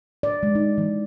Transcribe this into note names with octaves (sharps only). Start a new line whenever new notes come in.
D5
G#3
D#4
E3